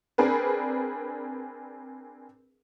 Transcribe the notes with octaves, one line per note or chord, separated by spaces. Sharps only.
C4 D4 G#4 A#4 B4